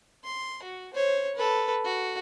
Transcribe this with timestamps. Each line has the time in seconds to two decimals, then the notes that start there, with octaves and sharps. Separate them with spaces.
0.24 C6
0.63 F#4
0.94 C5 C#5
1.35 A4 B4
1.85 F#4